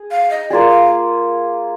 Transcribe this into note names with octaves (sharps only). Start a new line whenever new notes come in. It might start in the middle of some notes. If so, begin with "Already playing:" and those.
Already playing: G#4
F5
D#5
A#3 F4 G#4 D5
F5